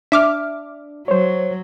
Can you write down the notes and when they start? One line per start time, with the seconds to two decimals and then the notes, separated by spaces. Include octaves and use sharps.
0.12 D4 E5 D6 F6
1.08 F#3 C5 C#5